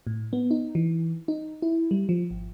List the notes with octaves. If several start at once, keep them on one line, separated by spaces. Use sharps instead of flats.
A2
B3
D#4
E3
D#4
E4
G3
F3
G#1